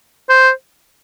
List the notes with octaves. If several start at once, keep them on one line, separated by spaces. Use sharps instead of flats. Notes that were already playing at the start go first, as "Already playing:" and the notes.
C5